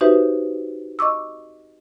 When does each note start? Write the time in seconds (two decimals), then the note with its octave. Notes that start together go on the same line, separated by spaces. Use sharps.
0.01 D#4 F#4 G4 B4 C5 E5
0.99 D#5 C#6 D6 E6